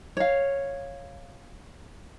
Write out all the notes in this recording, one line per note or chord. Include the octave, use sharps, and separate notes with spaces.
C#5 F5